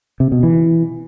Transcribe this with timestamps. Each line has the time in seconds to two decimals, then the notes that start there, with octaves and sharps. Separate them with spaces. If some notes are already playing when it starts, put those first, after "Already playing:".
0.20 C3
0.32 B2
0.43 E3